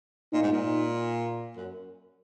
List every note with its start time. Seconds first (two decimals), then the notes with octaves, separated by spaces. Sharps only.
0.33 A#2 D#4
0.43 G#2
0.53 A#2
1.57 F#2